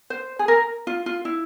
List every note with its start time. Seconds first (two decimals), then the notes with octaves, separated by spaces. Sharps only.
0.10 C5
0.39 G#4
0.48 A#4
0.87 F4
1.06 F4
1.25 E4